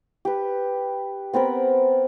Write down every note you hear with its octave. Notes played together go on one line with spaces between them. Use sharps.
G4 B4
B3 C4 A#4 B5